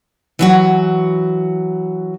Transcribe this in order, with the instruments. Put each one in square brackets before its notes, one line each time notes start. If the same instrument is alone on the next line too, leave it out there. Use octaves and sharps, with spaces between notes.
[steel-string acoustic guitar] E3 F#3 F#4